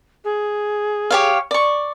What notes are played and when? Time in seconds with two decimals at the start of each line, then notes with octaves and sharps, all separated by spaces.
0.25 G#4
1.10 G4 C#5 F5
1.51 D5 C#6